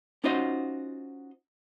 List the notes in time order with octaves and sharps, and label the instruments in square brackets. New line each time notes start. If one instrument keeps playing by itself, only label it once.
[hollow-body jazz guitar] C#4 D#4 F4 F#4 C5 D#5